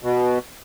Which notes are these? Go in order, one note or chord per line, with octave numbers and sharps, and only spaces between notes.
B2